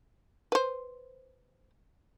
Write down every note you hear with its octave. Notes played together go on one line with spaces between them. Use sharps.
B4 C5